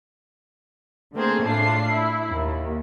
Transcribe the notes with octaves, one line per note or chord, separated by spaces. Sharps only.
D3 A3 A#3 C4 G#4
A2 D4 F4 C7
E4
D#2